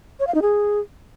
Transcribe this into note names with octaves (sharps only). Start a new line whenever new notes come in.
C#5
F5
D#4
G#4